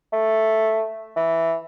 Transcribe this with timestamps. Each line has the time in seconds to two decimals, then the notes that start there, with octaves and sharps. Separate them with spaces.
0.13 A3
1.16 E3